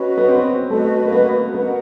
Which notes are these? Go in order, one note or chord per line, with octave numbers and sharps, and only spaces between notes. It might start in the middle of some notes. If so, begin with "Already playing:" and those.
Already playing: C#4 F#4 B4 D#5
B3
C4
A3 F#4 B4 D#5
A#3
B3
B3 F#4 A#4 D#5 F#5